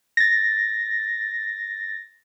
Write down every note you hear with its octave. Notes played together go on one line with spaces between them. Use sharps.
A6 A#6